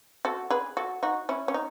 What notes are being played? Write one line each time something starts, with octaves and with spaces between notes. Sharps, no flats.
F#4 A4
G#4 B4
F#4 A4
D#4 F#4
C#4 E4
C#4
D#4